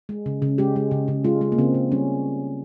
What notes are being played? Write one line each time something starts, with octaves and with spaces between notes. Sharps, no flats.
G#3
C#3
C#3
G#3 G4
G#3
C#3
C#3
G#3 F4
G#3
A#3
C#3 C4
C#3
G3 C#4